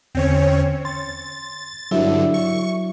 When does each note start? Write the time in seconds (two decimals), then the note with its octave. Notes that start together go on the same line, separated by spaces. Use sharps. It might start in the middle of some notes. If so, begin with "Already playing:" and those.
0.15 E2 D3 C4 C#4 C#5
0.85 C6 A6
1.91 G2 D3 F#3 E4 E5
2.34 C#6